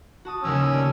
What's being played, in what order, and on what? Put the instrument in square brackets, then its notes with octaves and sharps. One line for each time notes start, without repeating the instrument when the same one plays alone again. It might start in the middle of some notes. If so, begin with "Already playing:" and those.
[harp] F#4 A5 D#6
[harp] D#2 C#3 F3 [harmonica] C#4 E6
[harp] A3 G4 D5